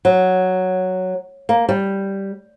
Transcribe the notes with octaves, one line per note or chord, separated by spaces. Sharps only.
F#3
A#3
G3